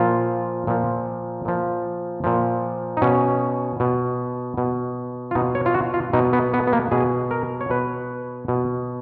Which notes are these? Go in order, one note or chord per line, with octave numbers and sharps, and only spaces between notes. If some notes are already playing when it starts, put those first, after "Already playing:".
Already playing: A#2 F3 F4
A#2 F3
A#2 F3
A#2 F3
D#4
B2 C#4
B2
B2
F4
B2 D#4
C#5
F4
F#4
F4
B2 D#4
B3
B3
B3
A#3
B2 G#4
A#4
C#5
B2 B4
B2